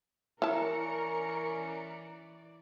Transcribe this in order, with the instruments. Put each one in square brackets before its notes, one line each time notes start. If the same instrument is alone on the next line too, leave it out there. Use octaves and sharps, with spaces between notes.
[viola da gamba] E3 D5 [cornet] C#4 [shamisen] E4 A5 [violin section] A#4 A#5 C#7